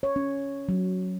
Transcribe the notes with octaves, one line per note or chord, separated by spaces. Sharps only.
C#5
C#4
F#3